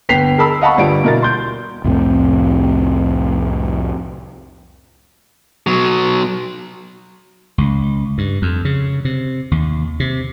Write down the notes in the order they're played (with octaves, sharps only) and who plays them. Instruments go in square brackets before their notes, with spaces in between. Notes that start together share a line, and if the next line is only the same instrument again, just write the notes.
[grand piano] G1 B3 G5 B6 C7 F7
G#4 A#4 A5 B5 E6
D#5 F5 F#5 A5 B5 C#6
G1 G3 F4 D7
B2 E4 A#4 A#5 A6
C6 G6
[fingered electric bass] C2 F2 A2 C4
[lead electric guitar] B2 F#3
[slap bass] C#2
G2
F2
C#3
C3
D#2
C3